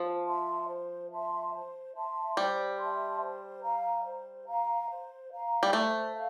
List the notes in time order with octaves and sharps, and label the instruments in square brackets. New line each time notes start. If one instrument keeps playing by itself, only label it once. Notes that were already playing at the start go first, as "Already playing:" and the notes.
Already playing: [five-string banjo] F3 [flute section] C5
[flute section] E5 A5 C6
C5
E5 A5 C6
C5
E5 A5 C6
[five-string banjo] G3 [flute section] C5
[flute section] E5 A5 C6
C5
F5 A#5
C5
F5 A#5
C5
F5 A#5
[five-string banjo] G3
[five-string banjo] A3 [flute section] C5
[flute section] F5